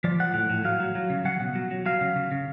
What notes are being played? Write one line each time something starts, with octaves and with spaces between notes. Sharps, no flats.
F3 D5
F3 F#5
A2
A2
F#3 F5
F#3
F#3
C#3
F#3 F#5
B2
F#3
F#3
F#3 F5
C#3
C#3
C#3